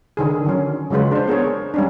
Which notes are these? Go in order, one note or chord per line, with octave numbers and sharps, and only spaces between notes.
D3 D#3 G#4
D3 F#3 C#4
C#3 F#3 G#3 F4 B4
D4 C5
B3 G#4 A#4 C#5
G3 C#4 D4